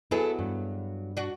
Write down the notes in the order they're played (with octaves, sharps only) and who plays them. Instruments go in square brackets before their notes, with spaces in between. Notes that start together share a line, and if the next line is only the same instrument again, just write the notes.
[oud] F#3 B3 G#4 [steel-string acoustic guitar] E4 A4
[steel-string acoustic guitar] G2
[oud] D4 F#4